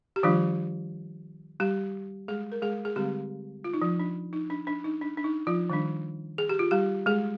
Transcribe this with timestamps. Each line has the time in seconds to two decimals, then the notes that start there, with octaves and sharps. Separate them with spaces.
0.16 G4
0.23 D#3 F3 G3 D4 F4
1.60 G3 G4
2.28 G#3 G#4
2.52 A#4
2.62 G#3 G#4
2.85 G#4
2.96 D3 G3 G#3 C4 G4
3.64 F4
3.74 D#4
3.81 F3 F4
3.99 D4
4.33 D#4
4.50 D4
4.67 D4
4.84 D#4
5.01 D4
5.17 D4
5.24 D#4
5.47 F3 F4
5.70 D#3 G3 D4
6.38 G#4
6.49 G4
6.59 F4
6.71 G3 G4
7.06 G#3 G#4